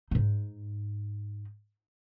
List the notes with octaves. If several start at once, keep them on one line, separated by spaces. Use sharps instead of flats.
G#2 D#4